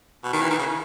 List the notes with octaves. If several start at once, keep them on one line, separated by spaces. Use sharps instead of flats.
B2
D#3
E3
D#3
C#3